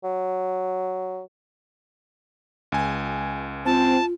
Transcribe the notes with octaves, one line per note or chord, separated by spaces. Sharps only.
F#3
C#2 G#5
C4 F4 A5